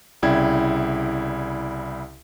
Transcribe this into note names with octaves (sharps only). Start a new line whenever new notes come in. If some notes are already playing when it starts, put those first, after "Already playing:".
C2 C#3 E4 D5 G5 G#6